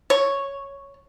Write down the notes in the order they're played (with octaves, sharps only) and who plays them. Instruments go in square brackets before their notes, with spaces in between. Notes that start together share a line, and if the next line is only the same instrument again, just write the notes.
[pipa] C#5